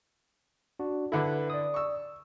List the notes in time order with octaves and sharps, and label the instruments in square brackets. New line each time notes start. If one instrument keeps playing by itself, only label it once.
[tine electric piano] D4 F#4
[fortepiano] D3 E4 [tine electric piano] A4 B4
[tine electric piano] D5 D#6
[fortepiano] C#6 E6